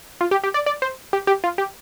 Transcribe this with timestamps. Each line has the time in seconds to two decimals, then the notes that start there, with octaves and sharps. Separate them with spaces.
0.21 F4
0.31 G4
0.44 G4
0.54 D5
0.66 D5
0.82 C5
1.13 G4
1.27 G4
1.44 F4
1.58 G4